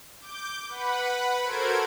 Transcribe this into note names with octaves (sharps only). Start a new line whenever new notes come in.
D6 G6
B4 F#5 B5
F#4 A4 A#4 C5 G#6 D7